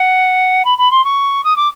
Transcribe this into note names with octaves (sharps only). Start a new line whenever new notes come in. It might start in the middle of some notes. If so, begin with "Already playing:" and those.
Already playing: F#5
B5
B5
C6
C#6
D#6
D6